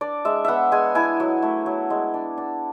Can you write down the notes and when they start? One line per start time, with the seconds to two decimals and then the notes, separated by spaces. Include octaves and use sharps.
0.01 D4 D5
0.25 G#3 E5
0.45 B3 E5 F#5
0.72 G#3 G#5
0.95 E4 G#5
1.20 F#3
1.42 A3
1.66 F#3
1.90 G#3
2.14 D4
2.37 D4